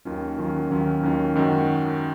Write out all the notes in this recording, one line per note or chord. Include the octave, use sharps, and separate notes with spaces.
D#2 D#3 F#3 C#4 F4
D#2 D#3 F#3 C#4 F4
D#2 D#3 F#3 C#4 F4
D#2 D#3 F#3 C#4 F4
F#2 D#3 G#3 C#4 F#4